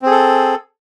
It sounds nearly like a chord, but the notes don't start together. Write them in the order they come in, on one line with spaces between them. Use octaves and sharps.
C4 G#4 A4